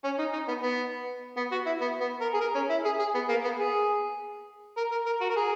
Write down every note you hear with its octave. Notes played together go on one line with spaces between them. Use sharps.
C#4
D#4
D#4
B3
B3
B3
F#4
E4
B3
B3
A#4
G#4
A#4
C#4
E4
G#4
G#4
B3
A#3
B3
G#4
A#4
A#4
A#4
F#4
A#4
G#4